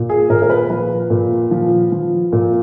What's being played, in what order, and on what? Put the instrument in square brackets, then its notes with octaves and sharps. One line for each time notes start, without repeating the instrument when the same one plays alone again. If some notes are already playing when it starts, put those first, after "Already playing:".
Already playing: [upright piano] A#2
G#4
A#2 A#4
A#4
B4
F3 B4
A#2
F3
F3
A#2